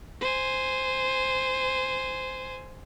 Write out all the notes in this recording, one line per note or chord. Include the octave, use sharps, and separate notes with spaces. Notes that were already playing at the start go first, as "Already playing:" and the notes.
C5 G#5